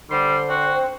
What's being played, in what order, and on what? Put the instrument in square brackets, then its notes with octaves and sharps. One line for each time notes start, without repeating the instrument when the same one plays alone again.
[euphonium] D3 [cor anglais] G3 [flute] C5 [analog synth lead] C6
[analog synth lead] C4 [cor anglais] F#4